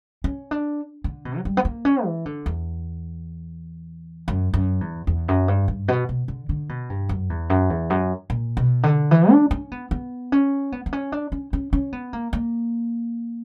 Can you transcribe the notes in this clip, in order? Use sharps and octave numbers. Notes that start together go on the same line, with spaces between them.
C#4
D4
D3
B2
F#3
G3
B3
A#3
C#4
E3
D3
E2
F#2
F#2
E2
E2
F#2
G2
G2
B2
B2
D3
D3
B2
G2
F#2
E2
F#2
E2
F#2
A#2
B2
D3
E3
D4
C#4
B3
B3
C#4
B3
B3
C#4
D4
C#4
C#4
C#4
B3
A#3
A#3